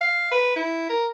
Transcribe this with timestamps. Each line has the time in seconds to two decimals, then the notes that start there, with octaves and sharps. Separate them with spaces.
0.01 F5
0.32 B4
0.56 E4
0.89 A#4